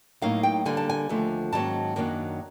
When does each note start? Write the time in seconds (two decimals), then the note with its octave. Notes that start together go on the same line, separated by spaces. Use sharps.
0.22 A2 F#3 A#3 D#4 F5
0.43 G5
0.66 D3 G3 A#3 G#5
0.77 A5
0.90 G#5
1.09 D#2 D3 F3 A3
1.52 G#2 D#3 F#3 A#3 C#4 A5
1.96 F#2 D#3 F#3 A#3 D4